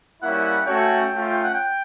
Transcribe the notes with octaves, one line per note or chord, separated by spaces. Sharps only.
G3 A#3 C#4 E4 F#5
F#5
A3 C#4 F#4 A4 C#5 G5
A3 C#4 F4
F#5
G5